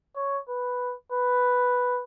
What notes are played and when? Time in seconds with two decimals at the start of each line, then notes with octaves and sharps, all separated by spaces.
0.16 C#5
0.49 B4
1.12 B4